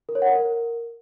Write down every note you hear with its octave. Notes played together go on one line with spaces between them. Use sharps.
A#4
C#5
F#5
A#4